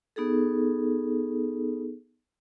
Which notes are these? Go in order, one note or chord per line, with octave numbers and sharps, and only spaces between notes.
B3 D#4 G#4 A4